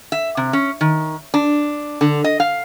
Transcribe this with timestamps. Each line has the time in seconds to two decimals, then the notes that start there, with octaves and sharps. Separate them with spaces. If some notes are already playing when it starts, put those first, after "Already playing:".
0.12 E5
0.37 C3
0.53 C#4
0.81 D#3
1.34 D4
2.01 D3
2.24 D#5
2.40 F5